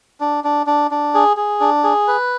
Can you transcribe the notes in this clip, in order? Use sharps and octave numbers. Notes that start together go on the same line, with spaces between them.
D4
D4
D4
D4
G#4
G#4
D4
G#4
B4